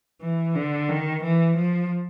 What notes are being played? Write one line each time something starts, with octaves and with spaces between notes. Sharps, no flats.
E3
D3
D#3
E3
F3